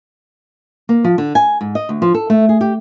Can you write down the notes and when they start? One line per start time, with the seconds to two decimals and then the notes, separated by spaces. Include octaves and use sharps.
0.89 A#3
1.04 F3
1.18 D3
1.35 G#5
1.61 G#2
1.75 D#5
1.89 D2
2.02 F3
2.14 A4
2.30 A3
2.49 G#4
2.61 G4